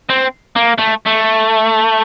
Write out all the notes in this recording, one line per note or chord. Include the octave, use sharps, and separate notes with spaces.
C4
A#3
A3
A3